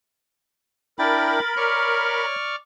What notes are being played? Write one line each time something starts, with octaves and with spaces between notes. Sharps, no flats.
D4 E4 A#4 G5 B5 A6
C#5 D5 C#6 F6